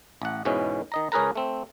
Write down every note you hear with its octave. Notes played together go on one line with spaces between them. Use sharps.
A1 F#5
E2 G#2 B2 E3 C#4
D#3 D#5 A#5
C#2 C#4 G#4 A#4 B4 A#5
A3 C4